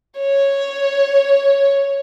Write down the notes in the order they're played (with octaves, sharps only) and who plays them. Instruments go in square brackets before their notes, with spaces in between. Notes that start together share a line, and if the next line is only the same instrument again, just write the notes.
[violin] C#5